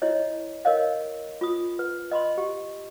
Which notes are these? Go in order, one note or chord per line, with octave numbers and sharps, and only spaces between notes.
E4 C#5 D#5
A#4 C#5 D#5 F5
F4 D#6
B4
D#5 B5 C6
G4